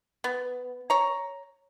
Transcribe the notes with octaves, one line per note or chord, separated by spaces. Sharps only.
B3
C#5 A#5